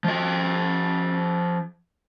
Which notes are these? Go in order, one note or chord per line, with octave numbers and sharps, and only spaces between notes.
F3 D#5